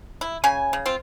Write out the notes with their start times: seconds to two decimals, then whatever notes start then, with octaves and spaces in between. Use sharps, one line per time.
0.21 E4
0.44 C#3 C#4 G#5
0.73 C#3
0.86 C4 F4